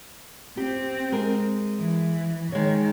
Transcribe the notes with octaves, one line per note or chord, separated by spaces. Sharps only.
C4 G4
G#3 A#4
E3
D#3 G#3 C#5